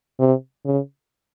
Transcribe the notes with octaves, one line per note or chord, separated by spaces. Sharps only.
C3
C#3